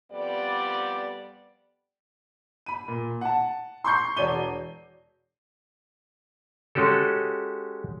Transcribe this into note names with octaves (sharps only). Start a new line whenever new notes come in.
F2 G3 B3 D5
B5 D#7
A#2
F#5 A5
C6 C#6 G6 C7
E1 F#4 C#5 D5 D#7 G7
G#3 C#4 F#4 G4 A4